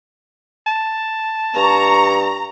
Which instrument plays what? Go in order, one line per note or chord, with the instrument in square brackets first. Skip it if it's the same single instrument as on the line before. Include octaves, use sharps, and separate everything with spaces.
[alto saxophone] A5
[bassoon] G2 [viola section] A#5 [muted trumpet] C#6